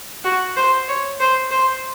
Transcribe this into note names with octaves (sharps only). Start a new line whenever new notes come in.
F#4
C5
C#5
C5
C5